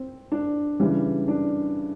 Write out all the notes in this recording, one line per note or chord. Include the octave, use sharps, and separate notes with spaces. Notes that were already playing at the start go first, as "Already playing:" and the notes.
Already playing: C4
D4
C#3 E3 G3
D4